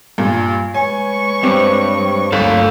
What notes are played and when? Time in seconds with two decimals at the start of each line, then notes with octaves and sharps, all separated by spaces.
0.18 G2 A#2
0.74 G#3 B4 C#5 G#5 C#6
1.43 G2 C4
2.32 G1 D2 F#3 A#3 A4 F5